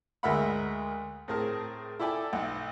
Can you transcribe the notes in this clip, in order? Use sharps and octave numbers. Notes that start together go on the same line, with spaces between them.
D2 G#3 A#4 E5 F#5 B5
A2 C4 G#4 A#4 A5
E4 A4 D5 G5 G#5
B1 F#5